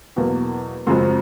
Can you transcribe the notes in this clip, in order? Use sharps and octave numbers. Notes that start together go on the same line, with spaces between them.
E2 B2 F#3 A#3
F#2 C#3 F3 G#3 C4 C6